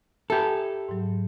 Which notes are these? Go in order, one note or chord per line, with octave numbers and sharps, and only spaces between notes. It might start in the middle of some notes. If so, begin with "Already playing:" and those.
G4 A4 E5 B5
G#2 F#3